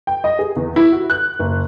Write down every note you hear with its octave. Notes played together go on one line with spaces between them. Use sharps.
G5
D#5
G#4
E2
E4
F#4
F#6
F#1